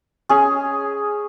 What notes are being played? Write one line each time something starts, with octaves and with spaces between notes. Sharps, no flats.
C#4 G#4